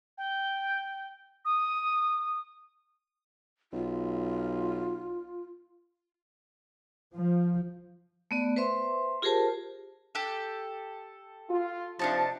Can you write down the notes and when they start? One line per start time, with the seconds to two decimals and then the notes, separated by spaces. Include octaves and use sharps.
0.18 G5
1.45 D#6
3.73 B1 F4
7.15 F3
8.31 A3 B3 D5
8.56 B4 C5 E5 C6
9.22 F4 G4 G#4 A#4 C5 A5
10.15 G4 A4
11.49 F4
11.99 C3 F3 D4 D#4 A5